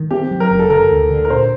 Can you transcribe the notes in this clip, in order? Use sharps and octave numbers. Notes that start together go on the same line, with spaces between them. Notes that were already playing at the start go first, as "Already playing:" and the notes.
Already playing: D#3
C4 G4
F#3
A#4
F#1
A4
D3 A#4
D2
D3
A#4
A#2 C5